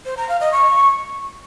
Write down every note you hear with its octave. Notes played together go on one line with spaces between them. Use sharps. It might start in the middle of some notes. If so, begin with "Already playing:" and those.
C5
A#5
F5
D#5
C#6